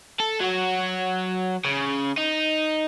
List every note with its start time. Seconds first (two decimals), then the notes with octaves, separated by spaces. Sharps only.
0.20 A4
0.40 F#3 F#4
1.65 C#3
2.17 D#4